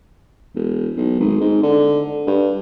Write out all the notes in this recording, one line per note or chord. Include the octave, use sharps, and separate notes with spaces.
E1
B1
G#1
G#2
D3
G2